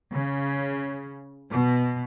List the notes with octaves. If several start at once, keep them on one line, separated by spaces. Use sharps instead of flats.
C#3
B2